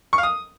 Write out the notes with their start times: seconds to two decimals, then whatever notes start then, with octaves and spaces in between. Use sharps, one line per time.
0.13 C#6
0.18 F5
0.23 D#6